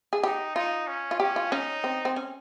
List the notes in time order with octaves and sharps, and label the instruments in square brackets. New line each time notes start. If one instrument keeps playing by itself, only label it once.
[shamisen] G#4
[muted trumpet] D#4 [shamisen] G4
[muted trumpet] D#4 [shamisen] F4
[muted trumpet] C#4
[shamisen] F4
[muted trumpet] C#4 [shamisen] G4
[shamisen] F4
[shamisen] C#4 [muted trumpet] D#4
[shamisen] C4
C4
C#4